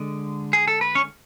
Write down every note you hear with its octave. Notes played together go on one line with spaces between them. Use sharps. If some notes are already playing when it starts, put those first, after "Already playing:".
Already playing: D3 G#3
G#4
A4
B4
C#4 C#5